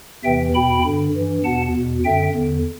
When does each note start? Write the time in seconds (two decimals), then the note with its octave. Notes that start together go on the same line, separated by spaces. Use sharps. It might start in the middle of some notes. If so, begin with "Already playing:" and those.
0.24 E2 C3 E3 E5 G5
0.54 E2 B2 G5 B5
0.85 G2 D3
1.14 G2 E3
1.44 E2 B2 F#5 A5
1.75 E2 B2
2.04 F#2 D3 E5 G5
2.35 E2 D3